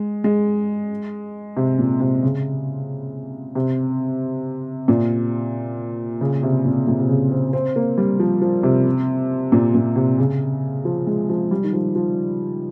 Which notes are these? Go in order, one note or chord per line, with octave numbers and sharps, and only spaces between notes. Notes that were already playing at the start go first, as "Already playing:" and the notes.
Already playing: G#3
G#3
C3
A#2
C3
C#3
C3
A#2
C#3
C3
A#2
A#2
C3
C#3
C4
C4
A#3
G3
F3
F3
C3
A#2
A#2
C3
C#3
F3
G#3
F3
G3
D#3
F3
F3